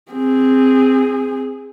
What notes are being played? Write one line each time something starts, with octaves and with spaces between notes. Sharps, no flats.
C4 G#4